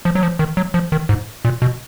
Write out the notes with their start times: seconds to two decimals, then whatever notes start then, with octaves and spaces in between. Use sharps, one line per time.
0.05 F3
0.15 F#3
0.23 F3
0.39 D#3
0.57 F#3
0.74 F3
0.92 D#3
1.09 G#2
1.45 A#2
1.62 B2